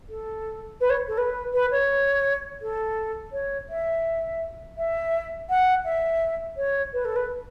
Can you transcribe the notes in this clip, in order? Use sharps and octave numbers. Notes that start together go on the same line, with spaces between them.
A4
B4
C#5
A4
B4
B4
C#5
A4
C#5
E5
E5
F#5
E5
C#5
B4
A4
B4